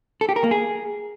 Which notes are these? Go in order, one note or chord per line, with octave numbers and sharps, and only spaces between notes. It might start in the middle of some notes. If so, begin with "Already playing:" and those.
A4
G4
A#4
A#3
G#4